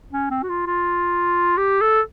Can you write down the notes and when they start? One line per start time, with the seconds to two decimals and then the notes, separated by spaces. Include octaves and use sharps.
0.12 C#4
0.31 C4
0.43 F#4
0.49 F4
0.67 F4
1.58 G4
1.81 A4